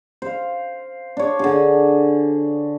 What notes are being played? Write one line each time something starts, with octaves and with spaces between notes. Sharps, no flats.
C5 F5
D4 C#5
D3 G#4